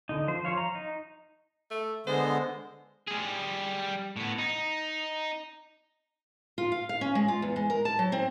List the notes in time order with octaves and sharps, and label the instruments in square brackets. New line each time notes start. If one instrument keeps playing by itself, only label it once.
[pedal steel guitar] D3 D#4
F3 C5
F3 C5 C#5 F5
A#5
D#4
[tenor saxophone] A3
[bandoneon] D3 G#3 B3 [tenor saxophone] C5
[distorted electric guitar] G3 G#4
A2 B3
D#4
[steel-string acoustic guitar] F4
F5
F5
C#4
G#3
F4
E2
G#3
A#4
A5
F#3
C4